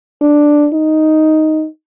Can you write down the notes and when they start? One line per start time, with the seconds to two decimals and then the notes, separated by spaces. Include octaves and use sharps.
0.21 D4
0.73 D#4